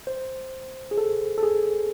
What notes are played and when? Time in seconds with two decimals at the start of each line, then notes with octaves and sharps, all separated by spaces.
0.07 C5
0.91 G#4
0.98 A4
1.38 A4
1.43 G#4